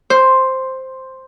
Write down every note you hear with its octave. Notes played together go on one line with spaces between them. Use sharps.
C5